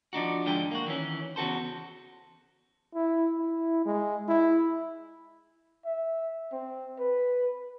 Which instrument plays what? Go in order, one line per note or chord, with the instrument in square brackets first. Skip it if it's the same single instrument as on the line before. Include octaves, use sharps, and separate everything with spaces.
[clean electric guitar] F3 D4 D#4 F#4
G#2 D3 F3 G#3 G5
A#3 F#4
D#3 E3 C#4
E2 C#3 F#4 A4 C5
[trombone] E4
E4
G#3
E4
[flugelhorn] E5
C4
B4